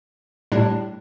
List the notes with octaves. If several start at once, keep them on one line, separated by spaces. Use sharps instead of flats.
A2 G3 D4